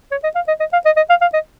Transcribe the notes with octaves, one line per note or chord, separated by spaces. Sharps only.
C#5
D#5
F5
D#5
D#5
F5
D#5
D#5
F5
F5
D#5